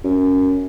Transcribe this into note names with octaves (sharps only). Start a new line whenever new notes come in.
F#2